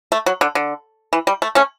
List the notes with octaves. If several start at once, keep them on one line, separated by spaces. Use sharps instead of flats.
A3
F#3
D3
D3
E3
G3
A3
A3 C#4